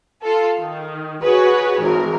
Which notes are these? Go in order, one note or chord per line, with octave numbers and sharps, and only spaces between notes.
F4 A4
D#3
F#4 G#4 B4 C#5
G#1 E3 A#4